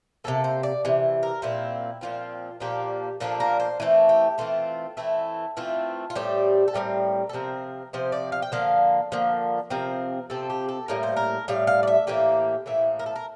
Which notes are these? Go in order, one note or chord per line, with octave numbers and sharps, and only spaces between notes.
C3 E3 A#3 A4
C5
D5
C3 E3
A#4
A#2 F3 C4 E4
A#2 F3 C4 F4
A#2 F3 A#3 D4 G4
A#2 F3 A#3 D4 A4
A#4
C5
E3 A3 C4
G4
E3 A3 C4 F4
E3 A3 C4 E4
E3 A3 C4 F4
F4
A2 G3 C4 G4
A4
A2 G3 C4 A#4
A4
C3 F3 C4 A#4
C3 F3 C4 C5
D5
F5
G5
D3 F3 A#3 F5
D3 F3 A#3
C3 F3 C4 A#4
C3 F3 C4 A4
G4
A4
A2 G3 A#3 A#4
C5
A#4
A2 G3 F5
F5
D5
E5
A2 E3 A#3 G4
A2 E3 A#3 E4
A#4
A4
A#4